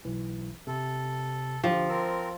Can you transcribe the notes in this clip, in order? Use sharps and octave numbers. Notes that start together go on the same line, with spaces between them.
B1 E3
C3 A4
D3 F3 G4
C4 A#4 E6